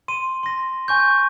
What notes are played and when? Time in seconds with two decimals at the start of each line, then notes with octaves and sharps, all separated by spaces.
0.08 C6 D#7
0.43 C6 A#6
0.88 G#5 C#6 G6